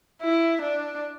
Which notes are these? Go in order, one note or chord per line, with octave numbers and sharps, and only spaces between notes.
E4
D4